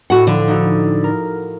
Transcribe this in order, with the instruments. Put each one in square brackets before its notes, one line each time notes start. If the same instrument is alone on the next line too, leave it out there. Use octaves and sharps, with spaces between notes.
[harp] A2 E4 [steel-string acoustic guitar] F#4 F#5
[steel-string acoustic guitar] D3 [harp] F3 F#5
[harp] D#4 E4 F#4
A#4